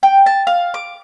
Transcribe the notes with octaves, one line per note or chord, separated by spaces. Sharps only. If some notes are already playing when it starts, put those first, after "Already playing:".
G5
A5
F5
D6